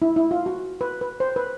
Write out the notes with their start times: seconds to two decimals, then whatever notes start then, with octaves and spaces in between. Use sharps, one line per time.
0.02 E4
0.16 E4
0.31 F4
0.46 F#4
0.81 B4
1.01 B4
1.20 C5
1.36 B4